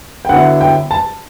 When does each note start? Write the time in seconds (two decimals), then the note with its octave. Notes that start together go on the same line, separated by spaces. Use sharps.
0.25 G5
0.29 D3 F#3 B3 E4 F#5
0.61 G5
0.91 A5